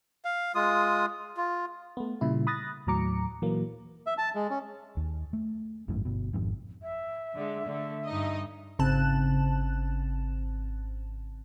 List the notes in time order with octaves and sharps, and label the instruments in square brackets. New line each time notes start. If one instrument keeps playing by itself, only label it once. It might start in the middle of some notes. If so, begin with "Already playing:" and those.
[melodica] F5
G#3 F4 D#6
F4
[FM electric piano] A3 B3
A#2 C#3 G3 E4
B5 D#6 F#6 A6 A#6
D#2 A2 F#3 A#5 D6 C#7
A#2 E3 F#3 A#3
[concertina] E5
A5
G#3
C#4
[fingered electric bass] D#2
A3
G#1 F#2 A2
G1 B2
G#1 F2 G#2
[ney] E5
[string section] D3 G#3
D3 A3
G2 D#4 D#5
[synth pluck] G#1 C#3 C4 A5 F#6 E7